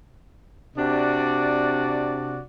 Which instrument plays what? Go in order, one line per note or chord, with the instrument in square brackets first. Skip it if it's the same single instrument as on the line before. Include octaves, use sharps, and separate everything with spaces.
[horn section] C3 D4 F#4 D5